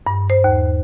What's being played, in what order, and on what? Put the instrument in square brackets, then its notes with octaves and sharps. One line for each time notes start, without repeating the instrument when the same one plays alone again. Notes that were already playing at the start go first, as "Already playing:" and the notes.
[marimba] G2
C5
D#2